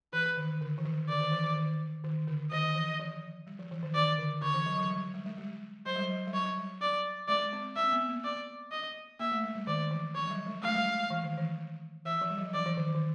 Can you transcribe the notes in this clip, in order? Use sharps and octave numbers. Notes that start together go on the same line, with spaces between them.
E3 B4
D#3
D3
E3
D#3
D3 D5
D#3
E3
D#3
D#3
D#3
D3
D#3 D#5
E3
F3
G3
F3
E3
D#3
D#3 D5
D3
D3 C#5
E3
F#3
F#3
G3
G3
G#3
G3
F#3 C5
G3
F#3
G3
F#3 C#5
G3
D5
G#3 D5
C4
C4 E5
B3
A#3
D5
D#5
A#3 E5
A3
G#3
G3
D#3 D5
E3
F3 C#5
F#3
G3
G#3
A3 F5
G3
G#3
E3
D#3
E3
E3 E5
F3
G3
F#3
E3 D5
E3
D#3
D#3